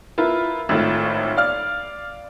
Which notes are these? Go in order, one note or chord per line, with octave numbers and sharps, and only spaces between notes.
E4 F4 A#4 B4
G#1 A2 F4
D5 F5 F6